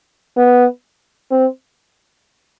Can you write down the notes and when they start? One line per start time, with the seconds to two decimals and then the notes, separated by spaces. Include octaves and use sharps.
0.37 B3
1.31 C4